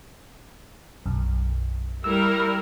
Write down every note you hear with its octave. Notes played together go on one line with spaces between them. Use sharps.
B1 F#2
G3 E4 A#4 E6